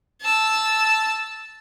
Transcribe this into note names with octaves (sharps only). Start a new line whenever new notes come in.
A5 E6